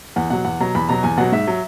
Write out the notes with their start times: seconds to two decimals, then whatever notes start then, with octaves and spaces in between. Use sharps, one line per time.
0.16 E2 F#5
0.30 B2 F#3 F#5
0.45 E2 F#5
0.60 B2 F#3 A#5
0.75 E2 B5
0.89 B2 F#3 A#5
1.03 E2 G#5
1.17 B2 F#3 F#5
1.32 G#2 E5
1.47 F#3